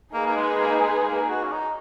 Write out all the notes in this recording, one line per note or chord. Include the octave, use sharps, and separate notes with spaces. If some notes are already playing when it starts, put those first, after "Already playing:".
A#3 D#4 G#4 B4
A#3
G#3
A#3
G#3
A#3
F#4
C#4
D#4